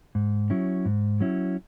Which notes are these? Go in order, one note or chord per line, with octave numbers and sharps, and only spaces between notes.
G#2
F#3 C#4 E4
G#2
F#3 C#4 E4